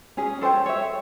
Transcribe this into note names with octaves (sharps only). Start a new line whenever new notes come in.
C#4 G#4
A4 C5 C#5 G5
C#5 E5